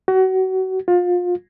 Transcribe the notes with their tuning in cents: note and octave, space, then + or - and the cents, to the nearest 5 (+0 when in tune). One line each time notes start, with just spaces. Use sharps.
F#4 +30
F4 +30